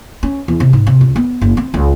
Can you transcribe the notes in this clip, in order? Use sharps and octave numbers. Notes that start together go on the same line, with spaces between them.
C#4
E2
C3
G#2
C3
C#2
B3
F#1
C4
C#2